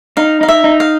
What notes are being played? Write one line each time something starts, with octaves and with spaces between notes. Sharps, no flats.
D#4 F5
D#4 F5
E5
D#4
F5